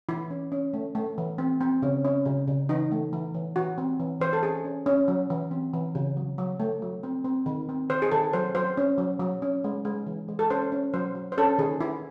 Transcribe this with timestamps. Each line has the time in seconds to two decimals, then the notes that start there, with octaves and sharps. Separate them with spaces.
0.09 E3 E4
0.30 C#4
0.52 C#4
0.74 A3
0.95 A3
1.18 E3
1.38 C4
1.61 C4
1.82 C#3 C#4
2.05 C#4
2.25 C#3
2.48 C#3
2.69 E3 D#4
2.91 A3
3.13 E3
3.34 E3
3.56 E3 F#4
3.78 C4
3.99 E3
4.20 E3 C5
4.33 A4
4.43 C#4 G#4
4.64 C#4
4.86 C#4
5.08 F#3
5.30 E3
5.51 C4
5.74 E3
5.95 C#3
6.17 F#3
6.38 F#3
6.60 A3
6.82 F#3
7.03 C4
7.25 C4
7.46 D#3
7.69 C4
7.89 D#3 C5
8.02 G#4
8.11 D#3 A4
8.33 F#3 C5
8.55 F#3 C5
8.77 C#4
8.98 F#3
9.20 F#3
9.42 C#4
9.64 G#3
9.85 G#3
10.07 E3
10.28 G#3
10.39 A4
10.50 C#4 C5
10.72 C#4
10.94 F#3 C5
11.15 F#3
11.32 C5
11.38 C#4 A4
11.58 D#3 G#4
11.80 D#3 E4